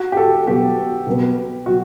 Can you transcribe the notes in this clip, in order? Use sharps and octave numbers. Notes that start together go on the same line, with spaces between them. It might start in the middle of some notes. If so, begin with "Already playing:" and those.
Already playing: F#4
G4
A4
B2 F#3 B3 G4
B2 F#3 B3
B2 F#3 F#4